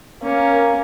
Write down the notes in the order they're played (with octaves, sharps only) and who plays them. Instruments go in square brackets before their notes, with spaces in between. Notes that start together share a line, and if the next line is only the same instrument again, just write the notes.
[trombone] A#3 [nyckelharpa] C#4 A#4